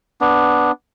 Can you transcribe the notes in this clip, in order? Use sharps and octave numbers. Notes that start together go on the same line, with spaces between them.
B3 D4